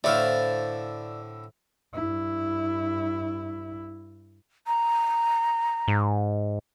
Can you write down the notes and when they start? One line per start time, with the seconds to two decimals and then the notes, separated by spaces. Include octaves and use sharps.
0.04 A2 D3 A3 E4 C5 D5 F5
1.93 G2 E4
4.67 A#5
5.88 G#2